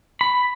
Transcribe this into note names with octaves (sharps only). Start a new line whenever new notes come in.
B5